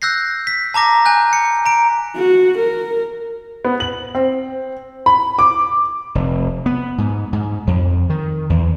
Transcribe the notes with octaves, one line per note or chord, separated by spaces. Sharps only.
E6 F#6 G6 A#6 C7
B6
A5 A#5 D6 A#6 B6
G#5 F#6 G6
C#7
A#5 D7
F#4
A#4
B3
F#7
C4
B5
D6
F1
B3
G#2
G#2
F2
D#3
E2